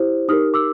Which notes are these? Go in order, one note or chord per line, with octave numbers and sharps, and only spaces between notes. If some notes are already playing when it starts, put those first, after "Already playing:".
Already playing: E4 G4 C5
D#4 G4 A#4 D#6 F6
D6 E6